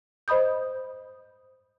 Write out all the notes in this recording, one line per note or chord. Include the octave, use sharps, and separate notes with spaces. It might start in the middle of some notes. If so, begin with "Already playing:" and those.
C5 D#5 B5 D#6 G6